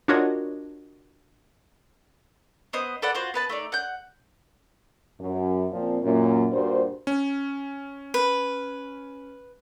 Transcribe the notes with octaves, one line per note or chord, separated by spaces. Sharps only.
D4 F4 F#4 A#4 C#5 D#5
B3 C5 D#5
A4 B4 D5 F#5
F4 F#4 C5
B3 B4 A5
A3 D#4 D5
F#5 G6
F#2
A#2 F3 C4
F#2 A#2
G2 A#2 F#4 C5
C#4
B4